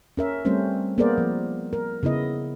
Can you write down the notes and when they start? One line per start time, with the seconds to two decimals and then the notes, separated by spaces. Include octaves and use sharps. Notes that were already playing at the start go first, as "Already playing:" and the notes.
0.17 C#4 A#4 E5
0.45 G3 A3 C4 C#4 C5
0.98 A#3 B3 G#4 A#4 C5 D5
1.18 F3
1.73 A#4
2.03 C#3 B3 E4 D#5